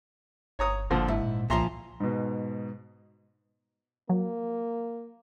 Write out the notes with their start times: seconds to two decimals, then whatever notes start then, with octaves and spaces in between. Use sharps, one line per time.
0.59 G1 C#5 A#5 D#6
0.90 G1 A#2 D3 F3
1.08 G#2 E4
1.23 A#2
1.50 C2 A#2 F3 E5 A#5 C6
2.00 G#2 B2
4.09 F#3 A#3